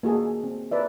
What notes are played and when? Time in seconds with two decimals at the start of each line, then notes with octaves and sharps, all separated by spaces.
0.03 A#3 F#4 G#4 A4
0.44 C4
0.71 A#4 B4 D5 E5